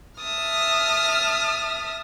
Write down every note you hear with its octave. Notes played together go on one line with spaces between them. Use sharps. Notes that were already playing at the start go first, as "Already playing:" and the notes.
E5 A5 D#6 F6